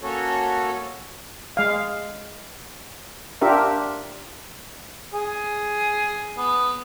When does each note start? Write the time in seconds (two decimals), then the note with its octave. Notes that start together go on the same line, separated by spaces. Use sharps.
0.03 A#3 C#4 F#4 A4 C#5
1.57 G#3 F5
3.41 D4 F4 G4 A#4 E5
5.14 G#4
6.38 B3